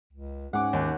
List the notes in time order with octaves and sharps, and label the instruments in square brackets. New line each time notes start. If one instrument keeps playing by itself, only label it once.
[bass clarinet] C#2
[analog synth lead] G#2 [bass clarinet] C#4 [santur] F#5 D6
[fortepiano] D#2